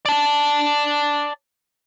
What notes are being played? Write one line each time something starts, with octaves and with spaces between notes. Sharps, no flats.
D5 A5